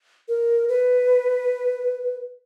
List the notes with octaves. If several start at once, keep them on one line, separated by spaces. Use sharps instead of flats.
A#4
B4